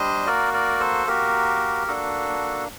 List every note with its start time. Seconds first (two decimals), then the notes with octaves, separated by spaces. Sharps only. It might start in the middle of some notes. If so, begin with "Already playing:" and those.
Already playing: G3 D4 C5 D#5
0.26 A#3 F#4 A#4 D5
0.54 A#4 D5
0.80 A4 C5
1.07 A#3 F#4 G4 A#4
1.87 A#3 D4 F#4 A4